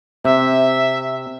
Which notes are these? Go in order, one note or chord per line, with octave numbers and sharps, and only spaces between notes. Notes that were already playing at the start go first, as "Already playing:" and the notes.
C3 E5